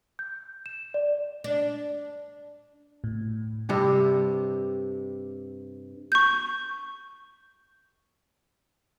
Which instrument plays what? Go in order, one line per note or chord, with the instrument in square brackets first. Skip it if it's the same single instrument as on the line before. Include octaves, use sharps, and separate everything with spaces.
[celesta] G6
E7
D5
[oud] D4
[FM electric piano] A2
[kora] G2 C3 G4
[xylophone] C#6 G6